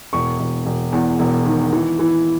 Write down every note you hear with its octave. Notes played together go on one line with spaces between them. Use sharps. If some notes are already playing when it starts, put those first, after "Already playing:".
E1 C#6
E1
E1
E2
E1
D#3
E3
E3